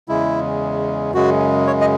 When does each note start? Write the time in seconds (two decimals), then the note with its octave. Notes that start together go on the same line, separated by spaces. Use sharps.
0.09 E2 C#3 G#3 E4
1.13 F#2 C#3 G#3 F#4
1.67 C#5
1.81 D#5